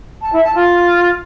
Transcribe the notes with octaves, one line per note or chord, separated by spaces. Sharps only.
A5
E4
A5
F4